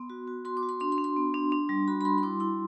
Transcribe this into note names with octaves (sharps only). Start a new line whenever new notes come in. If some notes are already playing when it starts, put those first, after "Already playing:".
Already playing: B3 C6
F#4
F#4
F#4 C6
D6
F#4
C6
D4 C6
C6
D4
C6
B3
D4
D4
G3
F#4 B5
B5
G3 C6
C6
E4 D6
E4 C6